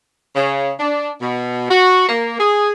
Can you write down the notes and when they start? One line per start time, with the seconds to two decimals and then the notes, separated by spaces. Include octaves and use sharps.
0.36 C#3
0.80 D4
1.21 B2
1.70 F#4
2.09 A#3
2.39 G#4